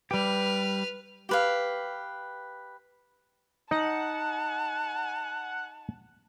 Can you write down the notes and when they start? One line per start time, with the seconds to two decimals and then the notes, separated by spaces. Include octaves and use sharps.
0.11 G3 G4 B4 F6
1.29 G4 B4 F5
3.71 D#4 F#5 A5